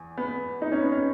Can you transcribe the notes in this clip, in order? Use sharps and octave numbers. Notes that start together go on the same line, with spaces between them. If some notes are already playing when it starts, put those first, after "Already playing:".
Already playing: E2
B3
D#4
C#4
B3
C#4